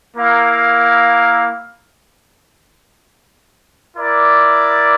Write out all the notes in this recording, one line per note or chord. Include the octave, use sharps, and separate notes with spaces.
A#3 E4 A#4 F5
E4 A#4 D5